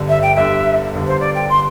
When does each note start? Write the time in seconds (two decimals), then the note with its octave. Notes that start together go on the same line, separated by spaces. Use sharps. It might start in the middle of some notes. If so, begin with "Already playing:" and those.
Already playing: G1 G2 D3
0.09 E5
0.22 G5
0.36 G1 G2 D3 E5
0.93 G1 G2 D3
1.07 C5
1.20 D5
1.35 G5
1.49 D3 C6